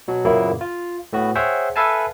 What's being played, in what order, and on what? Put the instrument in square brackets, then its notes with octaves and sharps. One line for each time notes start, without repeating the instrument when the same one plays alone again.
[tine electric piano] B2 F#3
F#2 A#2 C#3 A#3 B3 E4
F4
A2 B3 F#4
G#4 C5 C#5 E5 F#5 G5
A4 B4 E5 F5 G#5 A5